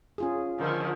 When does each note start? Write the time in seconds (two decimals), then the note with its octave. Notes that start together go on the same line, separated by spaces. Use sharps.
0.18 C#4 F4 G#4
0.59 D3 D#3 F3